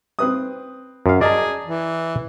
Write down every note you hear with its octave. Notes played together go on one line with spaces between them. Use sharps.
C4 B4 D#6
F#2 F5
G#4 D5 D#5 A5 A#5
E3